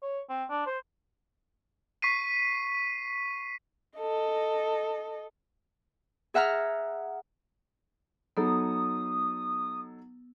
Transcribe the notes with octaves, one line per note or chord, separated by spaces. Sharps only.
C#5
C4
D4
C5
C#6 B6 C7 D#7
A4 D#5
G#4 E5 F#5 A#5 F6
F#3 B3 D#4 A4 D#6